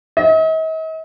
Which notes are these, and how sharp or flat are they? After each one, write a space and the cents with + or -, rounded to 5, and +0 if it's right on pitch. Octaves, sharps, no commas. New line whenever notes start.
D#5 +45